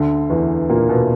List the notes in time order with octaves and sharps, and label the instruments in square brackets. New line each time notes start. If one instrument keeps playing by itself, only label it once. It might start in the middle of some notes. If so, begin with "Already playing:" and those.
Already playing: [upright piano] D2 D3
E2 E3
A#2 A#3
B2 B3